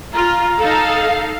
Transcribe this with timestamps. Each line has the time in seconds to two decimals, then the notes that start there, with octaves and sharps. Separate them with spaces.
0.14 F4 A#5
0.58 D#4 A4 F5